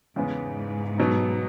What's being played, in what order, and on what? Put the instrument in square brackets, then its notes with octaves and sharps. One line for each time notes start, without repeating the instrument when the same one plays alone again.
[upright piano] E2 C#3 G#3 B3 [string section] G#2
[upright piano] B2 F#3 B3 D#4